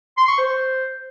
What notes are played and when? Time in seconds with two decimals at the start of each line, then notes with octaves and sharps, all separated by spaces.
0.18 C6
0.28 C#6
0.38 C5